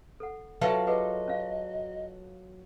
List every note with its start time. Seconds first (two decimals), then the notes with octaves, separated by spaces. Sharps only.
0.20 A4 F#5
0.61 F#3 F4 A4 B4 E5 F5
0.87 G#4 B4 D#5 F#5
1.28 C#4 F5